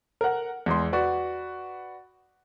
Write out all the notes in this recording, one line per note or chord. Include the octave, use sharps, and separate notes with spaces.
A#4 F#5
E2 G#3 C6
F#4 B4 D5